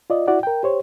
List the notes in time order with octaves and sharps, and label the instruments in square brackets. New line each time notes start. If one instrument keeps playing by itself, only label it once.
[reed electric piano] F4 D5 D#5
E4 F#4 D5 F#5
A#4 G5
G4 C5 C#5